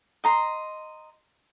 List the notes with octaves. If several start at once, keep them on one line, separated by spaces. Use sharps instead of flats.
D#5 A#5 C6